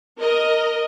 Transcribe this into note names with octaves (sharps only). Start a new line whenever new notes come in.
A#4 D#5